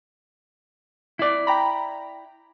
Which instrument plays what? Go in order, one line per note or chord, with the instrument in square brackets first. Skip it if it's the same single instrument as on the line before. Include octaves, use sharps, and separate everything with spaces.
[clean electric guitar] E4 D5
[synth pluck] G5 A#5 B5